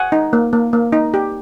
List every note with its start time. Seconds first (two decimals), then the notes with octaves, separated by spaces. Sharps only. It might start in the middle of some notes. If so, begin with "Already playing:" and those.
Already playing: F#5 G#5
0.12 D#4
0.33 A#3
0.53 A#3
0.73 A#3
0.92 D#4
1.14 G4